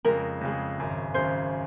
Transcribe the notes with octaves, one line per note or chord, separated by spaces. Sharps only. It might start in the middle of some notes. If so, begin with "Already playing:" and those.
F2 C#3 G#3 A#4
F2 C#3 G#3
G#1 F#2 C#3
G#1 F#2 C#3 C5